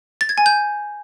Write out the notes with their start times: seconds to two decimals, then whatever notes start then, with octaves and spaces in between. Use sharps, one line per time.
0.21 A6
0.29 G#6
0.38 G#5
0.46 G6